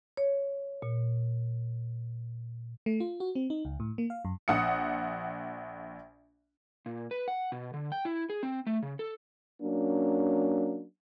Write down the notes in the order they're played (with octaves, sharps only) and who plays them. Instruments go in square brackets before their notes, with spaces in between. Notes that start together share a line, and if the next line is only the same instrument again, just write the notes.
[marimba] C#5
A#2
[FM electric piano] A3
F4
F#4
C4
D#4
C#2
A2
A#3
F5
F#2
[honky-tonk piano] A#1 F#5 D#6 C#7
[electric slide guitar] A#2
B4
F#5
B2
D3
G5
E4
G#4
C4
A3
C#3
A4
[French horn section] F#3 A#3 C#4 D4